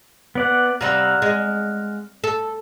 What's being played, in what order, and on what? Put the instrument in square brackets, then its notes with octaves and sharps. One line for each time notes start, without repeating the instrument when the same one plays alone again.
[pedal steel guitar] B3 D5 F#5
[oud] C3 G3 C4 [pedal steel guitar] F5 F#5 A#5
[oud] G#3
A4